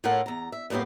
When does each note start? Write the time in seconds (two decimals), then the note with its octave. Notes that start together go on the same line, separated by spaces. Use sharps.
0.04 A2 C#4 F4 A4 A#4 F#5
0.26 E2 A#5
0.52 E5
0.70 F#2 A2 A#3 B3 G4